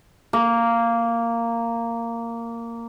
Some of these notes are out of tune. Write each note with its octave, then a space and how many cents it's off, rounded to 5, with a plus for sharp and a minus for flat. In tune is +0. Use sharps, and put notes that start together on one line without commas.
A#3 -10